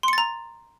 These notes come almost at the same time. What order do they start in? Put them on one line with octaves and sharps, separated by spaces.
C6 C#7 A6 A#5